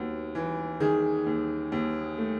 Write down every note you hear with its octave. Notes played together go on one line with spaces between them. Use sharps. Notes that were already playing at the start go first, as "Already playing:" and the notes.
Already playing: D#2 B3 F#4
E3
D#3 G#4
D#2
D#2
A3